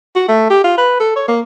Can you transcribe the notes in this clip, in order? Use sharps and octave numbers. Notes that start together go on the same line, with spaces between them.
F#4
A3
G4
F4
B4
A4
C#5
A#3